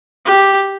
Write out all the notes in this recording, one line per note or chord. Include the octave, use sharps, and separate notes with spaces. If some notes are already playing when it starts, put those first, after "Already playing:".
G4